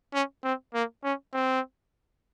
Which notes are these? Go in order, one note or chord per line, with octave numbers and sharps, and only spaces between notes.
C#4
C4
A#3
C#4
C4